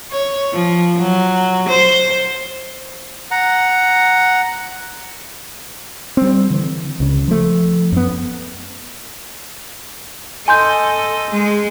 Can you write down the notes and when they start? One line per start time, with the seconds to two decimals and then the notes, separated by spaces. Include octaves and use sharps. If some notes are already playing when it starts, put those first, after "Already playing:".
0.11 C#5
0.53 F3
0.97 F#3
1.69 C5
3.31 F#5 A#5
6.17 G3 C4
6.50 D3 E3
7.00 C#2 C#3
7.28 F3 A3
7.92 F#2 B3
10.48 A4 D#5 G#5 C6 G6
11.30 G#3